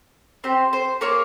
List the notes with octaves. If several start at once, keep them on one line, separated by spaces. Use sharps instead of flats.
C4 G4 C5
C5
A#3 F4 G#4 A#4 C#5